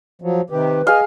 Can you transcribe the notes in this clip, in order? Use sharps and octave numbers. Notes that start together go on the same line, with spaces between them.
F3 F#3
C3 D#3 G4 B4
G#4 D#5 F5 G#5